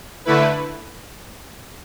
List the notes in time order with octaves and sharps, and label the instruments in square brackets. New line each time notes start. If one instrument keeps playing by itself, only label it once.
[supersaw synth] D3 A3 E4 B4